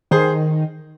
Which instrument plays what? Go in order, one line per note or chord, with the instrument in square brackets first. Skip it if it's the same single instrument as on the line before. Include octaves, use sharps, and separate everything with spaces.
[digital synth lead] D#3 [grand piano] G#4 C5